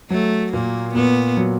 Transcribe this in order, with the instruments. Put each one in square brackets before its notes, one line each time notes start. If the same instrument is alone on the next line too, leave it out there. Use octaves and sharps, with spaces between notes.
[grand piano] F#3 [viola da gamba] A3
[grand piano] A#2 [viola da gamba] A#3
[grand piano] A#2 [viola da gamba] B3
[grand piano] F#3